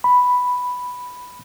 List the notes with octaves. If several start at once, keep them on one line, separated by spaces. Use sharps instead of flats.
B5